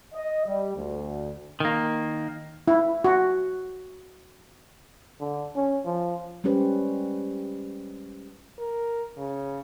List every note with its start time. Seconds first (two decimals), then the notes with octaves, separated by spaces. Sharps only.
0.14 D#5
0.46 G3
0.76 D2
1.60 D#3 A#3
2.68 E4
3.04 F#4
5.20 D3
5.55 C#4
5.85 F3
6.44 G3 G#3 C#4 G4 B4 C5
8.59 A#4
9.18 C#3